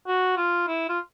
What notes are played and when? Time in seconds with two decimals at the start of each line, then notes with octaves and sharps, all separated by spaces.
0.07 F#4
0.37 F4
0.68 E4
0.89 F4